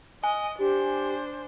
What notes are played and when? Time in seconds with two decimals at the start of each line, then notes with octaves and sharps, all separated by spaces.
0.24 D#5 G#5
0.59 D4 G4 C5